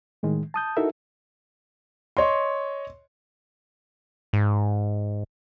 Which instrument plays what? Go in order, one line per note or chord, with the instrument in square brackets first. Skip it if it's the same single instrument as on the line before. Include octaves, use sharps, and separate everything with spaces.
[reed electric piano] A2 D#3 G#3
A5 D#6 G6
D#4 E4 F#4 A4 A#4 E5
[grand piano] C#5 D#5 C6
[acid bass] G#2